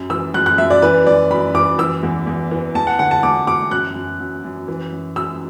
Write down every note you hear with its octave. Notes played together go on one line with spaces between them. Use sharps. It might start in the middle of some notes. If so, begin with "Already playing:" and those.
Already playing: F#2
E3 E6
F#2 F#6
F#6
F#2 E5
D5
E3 B4
F#2 D5
F#2 B5
E3 D6
E3 E6
E2
E2
E3
E2 A5
F#5
D3 F#5
A5
E2 D6
E2 D6
F#2 F#6
F#2
F#2
F#2
E3
F#2
F#2 E6